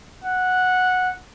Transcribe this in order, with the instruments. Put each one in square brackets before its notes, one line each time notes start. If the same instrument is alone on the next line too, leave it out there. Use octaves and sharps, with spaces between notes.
[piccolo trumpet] F#5